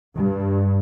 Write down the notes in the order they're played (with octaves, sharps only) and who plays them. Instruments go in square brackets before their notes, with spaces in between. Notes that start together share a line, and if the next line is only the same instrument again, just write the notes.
[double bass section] G2